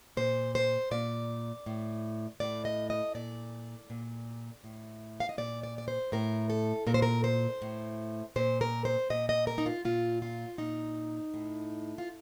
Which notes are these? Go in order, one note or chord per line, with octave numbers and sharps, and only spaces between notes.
A#2 C5
C5
A#2 D5
A2
A2 D5
D#5
D#5
A#2 D5
A#2
A2
F5
D#5
A#2 D5
D5
D5
C5
A2 A#4
A4
A#2 A#4
C5
A#4
C5
A2
A#2 C5
A#4
C5
A#2 D#5
D#5
A#4
D#4
F4
A#2 F4
F4
A#2 D#4
A2
F4